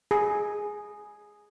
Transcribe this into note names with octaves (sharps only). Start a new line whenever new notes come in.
G#4